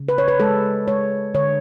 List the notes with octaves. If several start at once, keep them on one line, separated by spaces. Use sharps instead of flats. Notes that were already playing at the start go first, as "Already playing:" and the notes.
Already playing: C#3
B4
C#5
B4
G#3 A4
G#3 C#5
D3 C#5